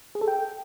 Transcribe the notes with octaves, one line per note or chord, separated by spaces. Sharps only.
G#4
A4
G5